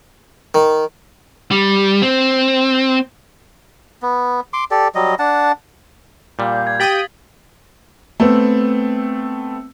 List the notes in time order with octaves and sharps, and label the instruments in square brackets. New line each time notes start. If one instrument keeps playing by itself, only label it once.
[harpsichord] D#3
[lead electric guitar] G3
C4
[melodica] B3
C6 D6
G4 A4 D5
F#3 G3 D#5
D4 F#5 A5
[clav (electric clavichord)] A#2 G3 [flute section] F5 G6
[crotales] G#6
[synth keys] G4 G5 D#6 [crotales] A6 B6 F#7
[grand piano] A3 B3 C4